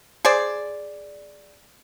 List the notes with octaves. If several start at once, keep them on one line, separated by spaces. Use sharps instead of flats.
G#4 C5 D5